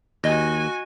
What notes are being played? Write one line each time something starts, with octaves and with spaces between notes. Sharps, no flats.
D#2 F#4 D#5 G#5 A#6